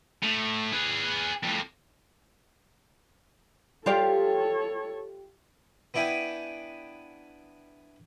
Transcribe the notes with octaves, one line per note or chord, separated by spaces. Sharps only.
A2
G#4 B4
F2 A2
F4 G4 A4 C#5 D5
B3 D4 E4 G5 G#5